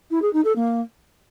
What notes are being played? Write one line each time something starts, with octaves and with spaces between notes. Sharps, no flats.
E4
G#4
D#4
A4
A#3